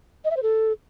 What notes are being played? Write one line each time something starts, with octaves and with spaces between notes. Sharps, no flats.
D#5
E5
C5
A4